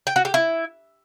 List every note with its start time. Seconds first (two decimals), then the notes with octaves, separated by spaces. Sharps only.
0.07 G5
0.16 F#4
0.25 G4
0.34 E4